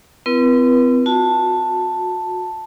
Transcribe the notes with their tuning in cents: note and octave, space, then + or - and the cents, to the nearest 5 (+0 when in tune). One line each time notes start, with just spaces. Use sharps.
C4 -40 E4 +45 B4 -40
F#4 -30 A5 +5